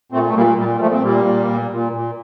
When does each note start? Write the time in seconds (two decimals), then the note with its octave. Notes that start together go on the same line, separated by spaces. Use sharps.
0.12 A#2 A3 C4
0.27 A3
0.35 A#2 G3 A#3
0.58 A#2 G3
0.76 G3
0.80 A#2 F3 A3
0.92 C4
1.03 A#2 G3 A#3
1.25 A#2
1.47 A#2
1.70 A#2
1.92 A#2